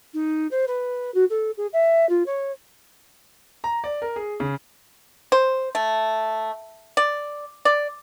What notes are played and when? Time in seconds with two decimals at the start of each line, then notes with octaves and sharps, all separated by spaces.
0.14 D#4
0.51 C5
0.67 B4
1.14 F#4
1.30 A4
1.57 G#4
1.73 E5
2.09 F4
2.26 C#5
3.64 A#5
3.84 D5
4.02 A#4
4.16 G#4
4.40 C#3
5.32 C5
5.75 A3
6.97 D5
7.65 D5